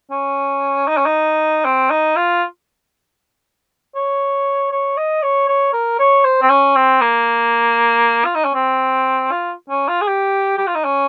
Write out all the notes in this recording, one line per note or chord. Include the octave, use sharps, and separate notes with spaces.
C#4
D#4
C#4
D#4
C4
D#4
F4
C#5
C#5
D#5
C#5
C#5
A#4
C#5
C5
C4
C#4
C4
A#3
F4
D#4
C#4
C4
F4
C#4
F4
G#4
G4
G4
F4
D#4
C#4